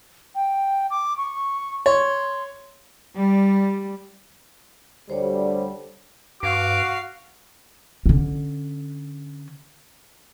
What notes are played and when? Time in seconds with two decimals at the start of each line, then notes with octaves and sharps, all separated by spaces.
0.35 G5
0.91 D6
1.17 C#6
1.86 C#5 C6
3.17 G3
5.10 D2 D3 G3 C5 C#5
6.43 G2 F#4 F5 D6
8.06 D3 C#4